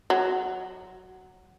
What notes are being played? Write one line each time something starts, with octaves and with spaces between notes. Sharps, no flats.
F#3